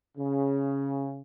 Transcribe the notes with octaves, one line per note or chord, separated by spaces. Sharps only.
C#3